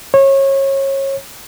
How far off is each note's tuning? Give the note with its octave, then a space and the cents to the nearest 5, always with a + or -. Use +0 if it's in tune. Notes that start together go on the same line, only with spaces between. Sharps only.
C#5 -25